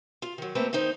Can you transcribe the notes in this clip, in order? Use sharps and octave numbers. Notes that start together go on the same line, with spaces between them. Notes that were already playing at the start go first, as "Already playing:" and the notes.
F4
D#3 F#3
A3 A#3 C4 A#4 B4
D#3 C4 D#4 C5